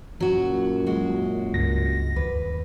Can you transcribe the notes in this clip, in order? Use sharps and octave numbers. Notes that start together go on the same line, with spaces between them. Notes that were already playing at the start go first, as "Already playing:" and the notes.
F#2 A#2 F#3 F#4
G#3 F#4
C#2 G2 A#6
D#2 B4